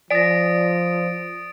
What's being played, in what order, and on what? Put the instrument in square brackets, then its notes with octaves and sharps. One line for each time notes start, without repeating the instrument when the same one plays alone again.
[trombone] F3 [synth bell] D5 A#6 [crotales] D#6 A6 D7